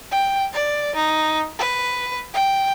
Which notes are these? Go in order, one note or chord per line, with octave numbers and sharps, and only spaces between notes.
G5
D5
D#4
B4
G5